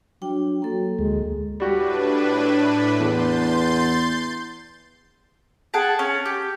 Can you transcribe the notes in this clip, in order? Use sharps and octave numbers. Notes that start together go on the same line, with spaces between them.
F#3 D4 G5
F#3 A#3 A4
D2 G#3
A2 G3 D4 F#4 G4 B4
E2 C6 G6 A6
G#4 F#5 G5 A5
C#4
G4